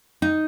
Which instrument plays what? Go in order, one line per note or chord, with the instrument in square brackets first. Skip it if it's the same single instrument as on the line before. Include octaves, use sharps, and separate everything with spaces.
[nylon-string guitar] D#4